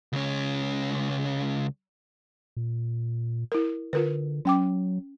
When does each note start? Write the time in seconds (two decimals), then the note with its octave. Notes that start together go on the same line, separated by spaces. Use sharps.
0.13 C#2 C#4
2.57 A#2
3.52 E4 A#4
3.93 D3 F4 A#4 B4
4.45 F#3 C#4 G5 D6